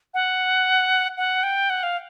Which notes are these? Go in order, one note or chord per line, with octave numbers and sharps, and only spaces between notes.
F#5
F#5
G5
F#5
F5